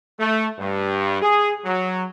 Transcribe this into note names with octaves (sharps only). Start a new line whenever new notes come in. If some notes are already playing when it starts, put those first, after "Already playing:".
A3
G2
G#4
F#3